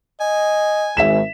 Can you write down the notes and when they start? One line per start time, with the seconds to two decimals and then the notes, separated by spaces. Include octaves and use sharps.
0.20 D#5 G#5
0.97 G#1 G#2 E5 B6 E7